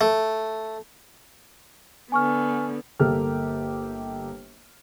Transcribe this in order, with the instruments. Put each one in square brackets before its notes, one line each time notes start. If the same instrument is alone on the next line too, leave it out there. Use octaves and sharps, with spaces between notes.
[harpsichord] A3
[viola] D3 B3 [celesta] G#5 C#6 F6
[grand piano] G1 A#3 G4 A4 F6